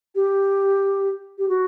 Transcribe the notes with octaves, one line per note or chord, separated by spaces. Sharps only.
G4
G4
F#4